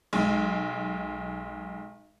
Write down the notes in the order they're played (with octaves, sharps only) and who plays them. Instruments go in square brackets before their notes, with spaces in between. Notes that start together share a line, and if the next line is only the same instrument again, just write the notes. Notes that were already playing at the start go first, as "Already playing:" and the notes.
[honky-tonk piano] B1 G#3